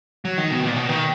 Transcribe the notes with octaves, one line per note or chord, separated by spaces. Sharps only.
F#3
D#3
B2
A#2
B2
D#3